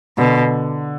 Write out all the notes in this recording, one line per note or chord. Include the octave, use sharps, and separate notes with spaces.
B2 D3